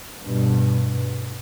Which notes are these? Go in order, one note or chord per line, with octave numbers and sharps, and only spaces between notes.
G2 B2